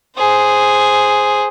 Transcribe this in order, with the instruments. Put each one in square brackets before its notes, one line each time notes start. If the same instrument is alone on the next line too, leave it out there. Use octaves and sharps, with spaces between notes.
[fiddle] G#4 C5